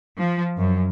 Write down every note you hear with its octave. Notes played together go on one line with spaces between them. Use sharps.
F3
F#2